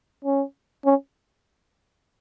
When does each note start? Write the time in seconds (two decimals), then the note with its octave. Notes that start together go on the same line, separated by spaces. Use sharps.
0.25 C#4
0.85 C#4